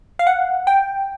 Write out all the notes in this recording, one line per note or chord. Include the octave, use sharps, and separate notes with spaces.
F5
F#5
G5